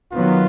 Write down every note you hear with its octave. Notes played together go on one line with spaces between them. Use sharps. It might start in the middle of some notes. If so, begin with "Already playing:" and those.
D#3 F#3 B3 F4